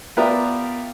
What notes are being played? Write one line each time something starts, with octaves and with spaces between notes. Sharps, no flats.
B3 F4 G4 A#4 D5 E5